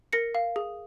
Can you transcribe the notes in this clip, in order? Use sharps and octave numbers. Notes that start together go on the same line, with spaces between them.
A#4 A#6 C#7
F5
G#4